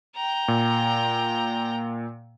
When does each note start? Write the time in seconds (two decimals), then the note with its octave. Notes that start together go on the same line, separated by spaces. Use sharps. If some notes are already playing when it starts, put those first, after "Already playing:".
0.16 G5 A#5
0.48 A#2